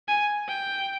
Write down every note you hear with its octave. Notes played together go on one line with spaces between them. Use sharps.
G#5
G5